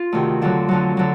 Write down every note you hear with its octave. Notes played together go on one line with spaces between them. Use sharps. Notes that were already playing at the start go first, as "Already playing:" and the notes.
Already playing: F4
D2 C3 D#3
F2 D3 F#3
F2 D3 F#3
D3 F#3